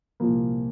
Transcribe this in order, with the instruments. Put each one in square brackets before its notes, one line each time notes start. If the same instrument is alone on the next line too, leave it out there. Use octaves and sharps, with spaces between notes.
[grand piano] C2 A#2 F3 A#3